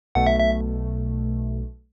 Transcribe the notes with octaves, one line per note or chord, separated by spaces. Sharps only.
B1 B2 A3 F#5
E5
E5